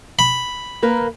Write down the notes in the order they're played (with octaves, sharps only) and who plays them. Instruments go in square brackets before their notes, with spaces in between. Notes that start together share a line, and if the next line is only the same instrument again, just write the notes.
[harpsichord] B5
[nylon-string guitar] A#3 A#4 B4